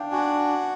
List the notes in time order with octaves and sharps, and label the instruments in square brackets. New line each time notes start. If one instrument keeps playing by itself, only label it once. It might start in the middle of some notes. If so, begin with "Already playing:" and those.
Already playing: [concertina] D4 [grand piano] F5 G5
[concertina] F#4 [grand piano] G#5